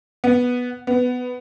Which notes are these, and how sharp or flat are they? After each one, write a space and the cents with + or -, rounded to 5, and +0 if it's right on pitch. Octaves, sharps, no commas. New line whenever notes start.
B3 -5
B3 +10